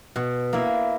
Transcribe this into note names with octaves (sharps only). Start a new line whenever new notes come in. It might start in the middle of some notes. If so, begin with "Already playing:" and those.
B2
A#3 E4